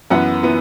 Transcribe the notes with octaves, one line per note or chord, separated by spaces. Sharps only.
F#2 E3 B3 F#5
E3 B3